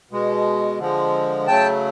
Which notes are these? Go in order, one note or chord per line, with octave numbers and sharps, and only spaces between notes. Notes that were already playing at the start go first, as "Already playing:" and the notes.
B2 G#3
D3 F3 G#3
C#3 F#3 A3 G5 A5